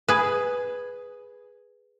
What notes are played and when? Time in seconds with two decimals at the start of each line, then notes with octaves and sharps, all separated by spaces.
0.08 G#4 B4